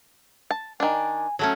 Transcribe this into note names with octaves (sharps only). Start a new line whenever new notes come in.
A5
D#3 D4 G#5
F#3 A3 C#4 A5